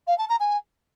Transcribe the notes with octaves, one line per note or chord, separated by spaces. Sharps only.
F5
A5
A#5
G#5